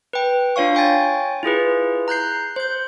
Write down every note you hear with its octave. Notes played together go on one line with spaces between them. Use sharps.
B4 G5
D4 F4 C#5 F5 C#6
C#5 G5 G#5 A6
E4 F4 G#4 B4
A#5 F#6 G6 C7
C5 G6